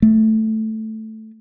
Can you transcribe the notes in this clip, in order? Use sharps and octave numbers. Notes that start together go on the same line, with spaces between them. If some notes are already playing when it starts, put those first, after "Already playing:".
A3